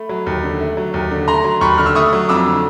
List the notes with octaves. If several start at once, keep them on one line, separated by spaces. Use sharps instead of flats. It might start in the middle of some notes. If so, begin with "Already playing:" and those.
Already playing: A3 B5
F#3
D#2
D3
A3
F#3
D#2
D3
A3 A#5 C6
F#3
D#2 B5 C#6
D3 F6
E6
A3 C#6 D#6
F#3
F2 D6 E6
D3